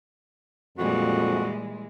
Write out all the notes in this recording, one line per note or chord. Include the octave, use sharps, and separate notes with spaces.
F2 A#2 E3 G3 G#3 F#4